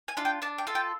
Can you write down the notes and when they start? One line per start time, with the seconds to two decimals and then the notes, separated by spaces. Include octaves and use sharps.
0.08 G#5
0.17 D4 F4
0.25 G5
0.42 D4 A5
0.58 G5
0.67 F4 A4
0.75 G5